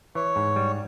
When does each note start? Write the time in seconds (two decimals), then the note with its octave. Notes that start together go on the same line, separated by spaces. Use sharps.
0.15 E3 C#5
0.36 G#2
0.56 G3